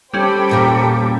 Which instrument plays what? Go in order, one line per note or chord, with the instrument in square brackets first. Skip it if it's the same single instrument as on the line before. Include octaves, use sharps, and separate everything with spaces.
[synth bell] G3 C#4 [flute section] G4 A4 D6 [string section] C5 G5 B5
[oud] E2 A#2 A#4